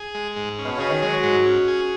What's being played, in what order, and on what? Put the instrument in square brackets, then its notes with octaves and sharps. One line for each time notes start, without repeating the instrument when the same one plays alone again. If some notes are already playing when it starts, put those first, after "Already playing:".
Already playing: [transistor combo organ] G#4
G#3
G#2
C#4
[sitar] B2
[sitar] C#3 [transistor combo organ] G#4
[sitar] D#3
[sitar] F#3 [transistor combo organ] G#3
[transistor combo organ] G#2
C#4
G#4